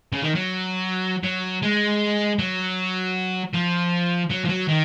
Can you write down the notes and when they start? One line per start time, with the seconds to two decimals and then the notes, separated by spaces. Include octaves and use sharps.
0.13 C#3
0.22 D#3
0.35 F#3
1.23 F#3
1.62 G#3
2.39 F#3
3.54 F3
4.30 F#3
4.45 F3
4.49 F#3
4.68 D#3